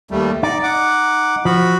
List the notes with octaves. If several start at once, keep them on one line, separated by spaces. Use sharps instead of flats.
D#2 G3 A3
D#4 D5 D6
F#5 D6
F3 F#4 B5